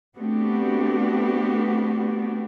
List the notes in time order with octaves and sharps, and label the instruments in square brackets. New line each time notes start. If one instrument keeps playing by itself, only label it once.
[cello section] A3 B3 C4 D4 F#4 G4